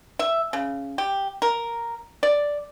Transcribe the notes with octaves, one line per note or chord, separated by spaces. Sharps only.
E5
C#3
G4
A#4
D5